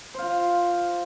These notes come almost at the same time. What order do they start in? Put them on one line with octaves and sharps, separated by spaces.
C5 F5 F4